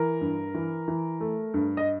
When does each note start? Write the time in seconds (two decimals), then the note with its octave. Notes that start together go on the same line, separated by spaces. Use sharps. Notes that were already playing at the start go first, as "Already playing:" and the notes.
Already playing: E3 A#4
0.21 G2
0.54 E3
0.88 E3
1.20 A3
1.54 G2
1.77 D#5